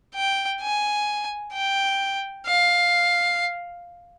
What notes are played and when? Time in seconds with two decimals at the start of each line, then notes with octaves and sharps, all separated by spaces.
0.15 G5
0.62 G#5
1.53 G5
2.46 F5